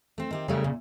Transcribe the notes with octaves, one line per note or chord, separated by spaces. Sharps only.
A3 C4
D#3 C4 G4
C#3 G3 A3 A#4
A#2